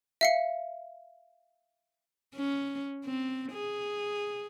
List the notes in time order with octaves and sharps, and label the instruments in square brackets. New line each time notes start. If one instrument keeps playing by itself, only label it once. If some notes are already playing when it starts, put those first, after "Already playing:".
[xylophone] E5 F5 C#7
[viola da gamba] C#4
C4
G#4